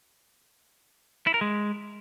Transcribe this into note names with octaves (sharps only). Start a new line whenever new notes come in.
E4
A#4
G#3